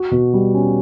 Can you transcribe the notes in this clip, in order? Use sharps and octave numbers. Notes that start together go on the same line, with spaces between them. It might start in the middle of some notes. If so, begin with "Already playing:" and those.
Already playing: F#4
B2
G3
C#4